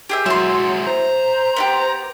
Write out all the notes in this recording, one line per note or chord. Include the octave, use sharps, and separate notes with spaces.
G4 G#4 E5
F#3 G#3 E4 E5 C6
C5 A#5
B3 D#4 G4